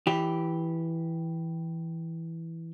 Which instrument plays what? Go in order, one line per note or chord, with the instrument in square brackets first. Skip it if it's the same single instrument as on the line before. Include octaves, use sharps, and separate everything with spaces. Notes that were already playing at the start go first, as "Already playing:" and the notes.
[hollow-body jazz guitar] E3 G4